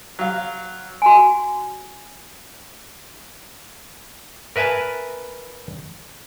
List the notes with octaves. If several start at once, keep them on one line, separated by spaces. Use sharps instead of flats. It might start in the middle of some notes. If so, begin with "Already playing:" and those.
F#3 F5
F#4 G#5
A#4 B4 E5 G#5 A5